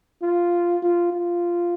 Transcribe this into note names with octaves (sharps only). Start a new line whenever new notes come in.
F4
F4
F4